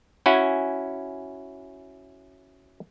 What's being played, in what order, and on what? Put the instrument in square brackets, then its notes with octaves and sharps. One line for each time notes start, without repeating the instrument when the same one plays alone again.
[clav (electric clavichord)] C#4 E4 F#4 F#5 G#5